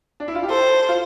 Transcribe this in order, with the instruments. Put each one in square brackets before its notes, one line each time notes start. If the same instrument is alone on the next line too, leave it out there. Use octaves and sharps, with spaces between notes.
[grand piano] D4
E4
F4
G4
[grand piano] A4 [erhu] C5
[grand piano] F4